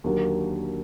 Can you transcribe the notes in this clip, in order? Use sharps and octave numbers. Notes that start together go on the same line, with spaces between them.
D#2 D3 F#3 A#3